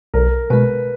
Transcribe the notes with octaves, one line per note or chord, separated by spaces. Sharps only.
B1 A#4
B2 G#3 B4